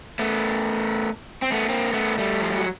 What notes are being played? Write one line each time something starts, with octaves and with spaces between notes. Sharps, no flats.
A3 B3
C4
A3 B3
A#3 C4
A3 B3
G3 A3
F3
F#3